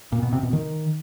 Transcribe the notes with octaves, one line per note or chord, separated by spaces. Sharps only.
A#2
B2
C3
B2
D#3